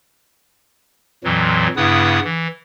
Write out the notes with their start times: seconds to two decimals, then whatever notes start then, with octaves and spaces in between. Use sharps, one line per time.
1.24 F2 A#2 E3 F#3
1.77 G2 C#3 B3 E4 B4 D#6
2.24 E3